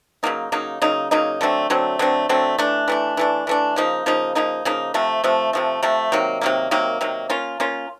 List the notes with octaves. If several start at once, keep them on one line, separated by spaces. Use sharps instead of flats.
C#3 F#3 A#3 D#4
C#3 F#3 A#3 D#4
C#3 F#3 A#3 D#4
C#3 F#3 A#3 D#4
D3 F#3 A3 C4
D3 F#3 A3 C4
D3 F#3 A3 C4
D3 F#3 A3 C4
E3 A3 D4
E3 A3 D4
E3 A3 D4
E3 A3 D4
C#3 F3 A#3 D#4
C#3 F3 A#3 D#4
C#3 F3 A#3 D#4
C#3 F3 A#3 D#4
C3 F3 A3
C3 F3 A3
C3 F3 A3
C3 F3 A3
C3 D#3 F#3 A#3
C3 D#3 F#3 A#3
C3 D#3 F#3 A#3
C3 D#3 F#3 A#3
A#3 C#4 F4
A#3 C#4 F4